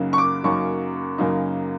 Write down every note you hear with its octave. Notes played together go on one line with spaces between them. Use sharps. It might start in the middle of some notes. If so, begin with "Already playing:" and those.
Already playing: F#2 C#3 F#3 A#3 D#4
C#6
D6
F#2 C#3 F#3 A#3 D#4 C#6
F#2 C#3 F#3 A#3 D#4